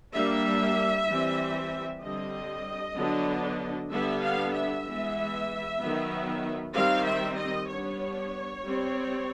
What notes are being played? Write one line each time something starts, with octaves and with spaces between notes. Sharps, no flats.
G3 A#3 D4 E5
E3 G3 C4
D3 G3 C4 D#5
D3 F#3 B3 D4
D3 G3 B3 D4 E5
F5
E5
E3 G#3 B3
D#3 F#3 B3
D#3 G3 C4 F5
E5
D#5
G3 B3 D4 C#5
G3 C4